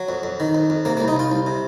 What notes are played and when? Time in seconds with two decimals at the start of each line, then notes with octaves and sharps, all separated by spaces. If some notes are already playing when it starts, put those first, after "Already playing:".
Already playing: F#3
0.09 F2
0.23 F2
0.40 D#3
0.55 F2
0.70 F2
0.85 C3 A#3
0.97 A#3
1.00 C2
1.08 D#4
1.16 C2 F4
1.31 C2
1.47 C3